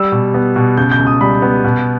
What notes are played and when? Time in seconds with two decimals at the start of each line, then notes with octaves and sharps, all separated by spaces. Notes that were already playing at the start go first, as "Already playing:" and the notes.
Already playing: G3 E6
0.12 B2
0.34 B3
0.56 B2
0.77 C#3 G6
0.92 G6
0.99 C#2
1.07 D#6
1.21 G3 B5
1.42 B3
1.64 B2